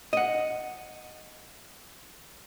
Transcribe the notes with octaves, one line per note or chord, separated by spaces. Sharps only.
D#5 F#5